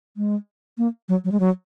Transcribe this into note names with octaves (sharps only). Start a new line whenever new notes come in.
G#3
A#3
F#3
F#3
G#3
F#3